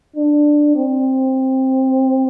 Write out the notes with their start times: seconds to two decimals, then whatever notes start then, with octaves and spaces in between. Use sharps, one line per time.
0.16 D4
0.76 C4